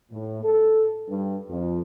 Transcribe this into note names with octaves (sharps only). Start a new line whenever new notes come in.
A2
A4
G2
F2